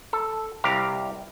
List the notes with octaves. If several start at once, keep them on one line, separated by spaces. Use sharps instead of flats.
A4
C2 G4 F5 A#5